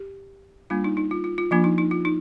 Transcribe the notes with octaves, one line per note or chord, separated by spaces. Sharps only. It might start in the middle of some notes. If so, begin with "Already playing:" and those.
Already playing: G4
G3 A#3 D4 F4
D#4
D#4
F4
F4
F4
F3 A#3 D4 F4
D#4
D#4
F4
D#4